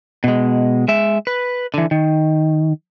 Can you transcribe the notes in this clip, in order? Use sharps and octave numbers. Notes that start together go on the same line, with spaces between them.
B2 G#3
G#3 E5
B4
D3 E3
D#3